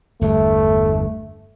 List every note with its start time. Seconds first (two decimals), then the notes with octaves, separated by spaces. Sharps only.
0.21 G1 E2 G2 A3